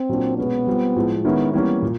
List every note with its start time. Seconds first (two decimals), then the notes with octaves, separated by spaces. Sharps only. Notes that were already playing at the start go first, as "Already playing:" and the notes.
Already playing: C4
0.09 A#2 F#3 A#3 D4
0.38 B2 G#3 B3 C#4
0.67 G3 C4 F4
0.96 A2 F3 G#3
1.25 D#3 G#3 B3 C#4 E4
1.53 E3 G3 A#3 B3 C#4
1.82 A#2